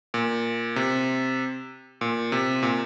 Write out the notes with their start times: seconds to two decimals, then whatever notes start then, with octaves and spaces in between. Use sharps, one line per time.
0.14 A#2
0.76 C3
2.01 A#2
2.32 C3
2.63 A#2